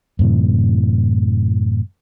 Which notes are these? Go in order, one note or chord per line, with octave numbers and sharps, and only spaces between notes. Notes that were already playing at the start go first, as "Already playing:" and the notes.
F#2 A2 C3 E3